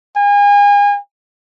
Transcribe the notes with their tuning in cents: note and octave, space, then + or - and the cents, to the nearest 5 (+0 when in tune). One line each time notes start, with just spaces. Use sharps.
G#5 -35